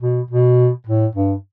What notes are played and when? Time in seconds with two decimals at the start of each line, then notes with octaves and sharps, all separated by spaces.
0.02 B2
0.30 B2
0.87 A2
1.15 G2